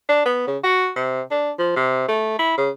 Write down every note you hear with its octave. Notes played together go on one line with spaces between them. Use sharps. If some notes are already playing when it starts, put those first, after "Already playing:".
D4
B3
C#3
F#4
C3
D4
F3
C3
A3
E4
C#3